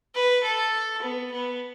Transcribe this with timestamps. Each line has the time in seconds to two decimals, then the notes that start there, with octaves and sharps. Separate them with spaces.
0.15 B4
0.44 A4
1.03 B3
1.31 B3